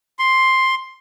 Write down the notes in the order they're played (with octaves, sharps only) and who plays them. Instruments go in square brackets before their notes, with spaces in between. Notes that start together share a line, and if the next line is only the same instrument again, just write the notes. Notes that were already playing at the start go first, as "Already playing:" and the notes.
[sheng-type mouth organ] C6